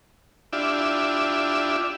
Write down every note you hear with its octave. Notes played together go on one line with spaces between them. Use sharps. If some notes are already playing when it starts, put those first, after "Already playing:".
D4 E4 F4 G4 D5 E5